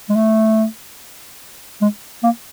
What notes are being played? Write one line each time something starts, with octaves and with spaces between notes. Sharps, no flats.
G#3
A3
G#3
A#3